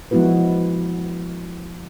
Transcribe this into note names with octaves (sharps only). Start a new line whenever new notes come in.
F3 G#3 B3 E4 F#4 B4